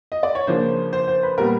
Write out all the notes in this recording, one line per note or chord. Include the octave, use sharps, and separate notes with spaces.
D#5
D5
C#5
C#3 F3 A#3 D4 C5
C5
C5
B4
A#2 G3 B3 A#4